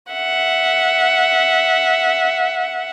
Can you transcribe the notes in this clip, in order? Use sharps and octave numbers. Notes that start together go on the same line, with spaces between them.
E5 F#5